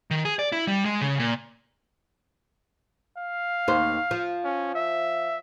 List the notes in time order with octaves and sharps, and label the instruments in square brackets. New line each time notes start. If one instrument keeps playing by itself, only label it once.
[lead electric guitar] D#3
G#4
D5
E4
G3
G#3
C#3
A#2
[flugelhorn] F5
[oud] D#2 D#3 C5
F3
[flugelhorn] C#4
E5